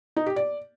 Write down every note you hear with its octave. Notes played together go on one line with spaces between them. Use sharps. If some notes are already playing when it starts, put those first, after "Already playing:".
D#4
G4
D5